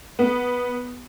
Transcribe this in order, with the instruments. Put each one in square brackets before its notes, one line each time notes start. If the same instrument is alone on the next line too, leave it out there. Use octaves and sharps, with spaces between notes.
[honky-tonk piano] B3